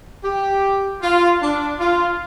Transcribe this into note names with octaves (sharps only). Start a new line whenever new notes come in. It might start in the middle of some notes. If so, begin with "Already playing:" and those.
G4
F4
D4
F4